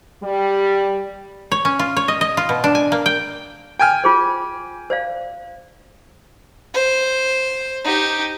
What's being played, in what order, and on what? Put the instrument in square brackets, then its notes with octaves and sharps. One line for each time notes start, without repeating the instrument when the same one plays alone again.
[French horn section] G3
[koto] C#5
C#4
F4
C#5
D#5
D#5
F4
B2
D4
G#5
A#3
G5
[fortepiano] G5 G#5 F6
[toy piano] F4 G#4 C5
C5 D5 F5
[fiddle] C5
D#4 G4